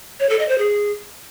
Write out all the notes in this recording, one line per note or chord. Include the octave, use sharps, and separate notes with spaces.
C#5
A4
D#5
C5
G#4